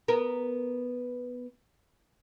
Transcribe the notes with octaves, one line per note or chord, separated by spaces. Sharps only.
B3 A#4